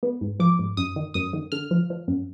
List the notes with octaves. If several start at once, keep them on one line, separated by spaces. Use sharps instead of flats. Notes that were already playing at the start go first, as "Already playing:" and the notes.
B3
G#2
F3 D6
G#2
F#2 D#6
D#3
F#2 D#6
D#3
D3 F6
F3
F3
F#2